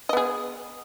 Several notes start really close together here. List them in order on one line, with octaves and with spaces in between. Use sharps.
D#5 B3 G#4